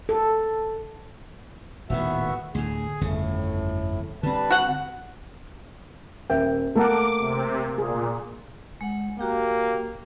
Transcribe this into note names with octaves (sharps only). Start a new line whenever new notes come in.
A4
D#1 A2 D#3 B3 F#4 E5
D2 A2 G#4
G1 F2 A2 C#3
D3 G3 C4 B4 A5
F#4 F#5
D#1 A#4 E5 G5
A3 A#3 A4 A#4 F#5 D6
C3
A#2 G#4
G#3 F#5
A#3 F#4 G4 G5